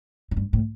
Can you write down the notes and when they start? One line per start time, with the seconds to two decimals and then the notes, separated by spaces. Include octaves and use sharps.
0.31 A2
0.37 G2
0.53 A2